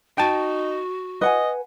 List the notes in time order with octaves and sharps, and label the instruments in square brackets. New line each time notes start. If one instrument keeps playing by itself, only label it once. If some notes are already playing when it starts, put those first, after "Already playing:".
[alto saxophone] D#4 [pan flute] F#4 [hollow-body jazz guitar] G5 A5
[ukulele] B4 F#5 G#5 [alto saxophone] D#5